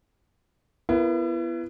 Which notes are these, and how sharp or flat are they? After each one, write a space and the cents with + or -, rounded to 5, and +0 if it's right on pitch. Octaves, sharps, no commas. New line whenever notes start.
B3 +0 E4 +35 A#4 +0